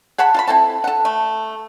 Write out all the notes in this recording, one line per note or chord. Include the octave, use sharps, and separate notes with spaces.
G#4 F#5 A5 B5
F4 A5 B5
C4 E4 A4 A5
A4 F#5
A3